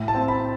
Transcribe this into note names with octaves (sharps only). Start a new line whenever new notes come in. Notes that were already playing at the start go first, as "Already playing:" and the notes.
Already playing: A2
A5
C4
B5